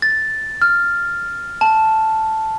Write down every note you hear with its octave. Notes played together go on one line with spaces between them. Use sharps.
A6
F6
A5